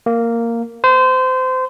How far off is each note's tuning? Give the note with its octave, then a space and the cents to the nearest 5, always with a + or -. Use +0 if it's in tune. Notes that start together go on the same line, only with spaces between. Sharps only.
A#3 -10
C5 -25